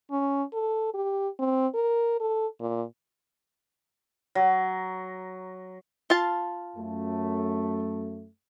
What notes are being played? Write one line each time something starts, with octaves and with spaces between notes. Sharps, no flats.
C#4
A4
G4
C4
A#4
A4
A#2
F#3
F4 F5 A5
F#2 A3